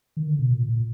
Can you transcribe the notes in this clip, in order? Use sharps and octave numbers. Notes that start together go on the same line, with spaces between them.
D#3
D3
B2
A#2
A#2